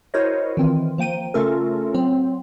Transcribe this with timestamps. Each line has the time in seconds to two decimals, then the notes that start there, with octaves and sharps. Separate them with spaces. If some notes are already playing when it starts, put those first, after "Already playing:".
0.14 E4 F#4 A#4 C5 C#5 D#5
0.57 D#3 E3 C4 F4
0.98 F3 A#3 G5 D#7
1.34 C#3 A3 C#4 F4 A4 A#4
1.94 F#3 C4